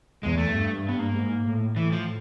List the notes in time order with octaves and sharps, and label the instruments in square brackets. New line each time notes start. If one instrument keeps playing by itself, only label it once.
[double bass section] E2 [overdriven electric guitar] G#3
[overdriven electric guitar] A3
[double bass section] G2
[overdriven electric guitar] B3
A#3
[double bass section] G#2
A2
[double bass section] A2 [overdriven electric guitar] E3
[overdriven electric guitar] F3